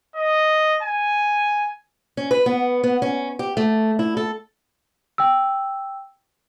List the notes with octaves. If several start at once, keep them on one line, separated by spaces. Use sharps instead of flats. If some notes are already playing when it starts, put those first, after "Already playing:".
D#5
G#5
C#4
B4
B3
B3
C#4
G4
A3
E4
A4
G5 E6